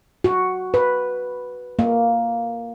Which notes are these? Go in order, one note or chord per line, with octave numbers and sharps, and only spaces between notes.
F#4
B4
A#3